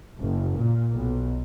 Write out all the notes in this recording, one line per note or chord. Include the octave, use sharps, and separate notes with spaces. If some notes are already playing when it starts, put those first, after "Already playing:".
F#1
A#2
B1